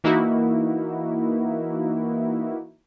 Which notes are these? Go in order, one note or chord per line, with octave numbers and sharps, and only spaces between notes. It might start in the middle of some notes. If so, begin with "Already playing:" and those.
E3 A#3 D#4 E4 F#4